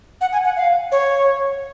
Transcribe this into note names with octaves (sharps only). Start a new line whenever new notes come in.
F#5
G#5
F#5
F5
C#5